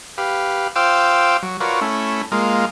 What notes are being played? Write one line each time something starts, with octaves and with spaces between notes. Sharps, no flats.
G4 B4 F5
F4 C5 F5 G5 D6 E6
F#3
F4 F#4 A#4 B4 C#5 D5
A3 C#4 E4
G#3 A#3 F4